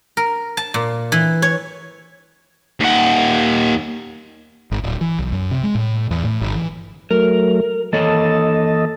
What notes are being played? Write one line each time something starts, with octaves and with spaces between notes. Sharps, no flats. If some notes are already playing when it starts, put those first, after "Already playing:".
A#4
A5
A#2
E3
C#5
D#2 F#5
G1
D1
E3
B1
F#2
C3
G#3
A2
E2
A2
G1
E3
F#3 A3 A#4
E3 A#3 A4 C#5 D#5 A5